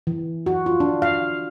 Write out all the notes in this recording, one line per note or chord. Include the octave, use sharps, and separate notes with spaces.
E3
F#4
F4
D4
F5